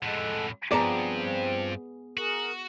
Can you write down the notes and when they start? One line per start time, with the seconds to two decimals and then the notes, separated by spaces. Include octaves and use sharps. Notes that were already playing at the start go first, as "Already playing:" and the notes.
0.03 F2 A2 G#3 A4 F#5
0.72 G2 F3 B3 C4 G#4 D5 A5 A#5
2.17 F#4 G#4 A#4